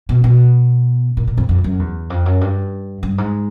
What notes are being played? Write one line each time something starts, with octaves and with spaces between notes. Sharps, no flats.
B2
B2
A#2
A#2
F2
F2
F#2
E2
F2
F#2
G2
G2
G#2